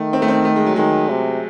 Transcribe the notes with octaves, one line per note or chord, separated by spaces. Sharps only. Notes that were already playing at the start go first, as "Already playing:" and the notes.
Already playing: D#3 A3
C4
A3
C4
A3
G#3
F#3
D#3 G#3
C3